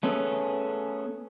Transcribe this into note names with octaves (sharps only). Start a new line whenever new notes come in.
A3 B3 C#4 G#4 A4